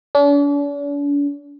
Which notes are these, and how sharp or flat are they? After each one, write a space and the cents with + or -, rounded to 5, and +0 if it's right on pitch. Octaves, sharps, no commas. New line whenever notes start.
D4 -45